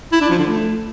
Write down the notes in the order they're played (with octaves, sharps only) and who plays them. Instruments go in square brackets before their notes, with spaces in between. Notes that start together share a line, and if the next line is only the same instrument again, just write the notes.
[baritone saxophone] E4
D4
F3
D3
A3